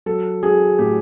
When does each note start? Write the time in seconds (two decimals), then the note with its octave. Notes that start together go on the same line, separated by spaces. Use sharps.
0.06 F#3 A4
0.43 F#3 G#4
0.79 A2 G4